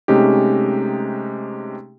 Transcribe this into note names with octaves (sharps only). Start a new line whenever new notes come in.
C3 G#3 A3 C#4 D#4 G4